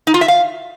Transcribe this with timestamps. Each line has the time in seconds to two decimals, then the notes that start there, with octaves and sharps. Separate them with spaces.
0.07 D#4
0.14 F4
0.21 E5
0.28 F5